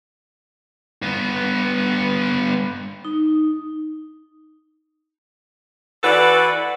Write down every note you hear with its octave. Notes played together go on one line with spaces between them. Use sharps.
G2 B3
D#4
E3 F#4 A4 B4 D5